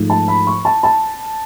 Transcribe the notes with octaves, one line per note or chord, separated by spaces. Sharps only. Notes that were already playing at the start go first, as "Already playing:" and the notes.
Already playing: G#2 F3 A3
A5
B5
C#6
A5
A5